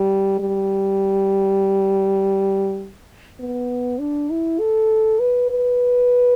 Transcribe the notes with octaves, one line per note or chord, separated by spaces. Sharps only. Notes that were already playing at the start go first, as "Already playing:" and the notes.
Already playing: G3
G3
B3
D4
E4
A4
B4
B4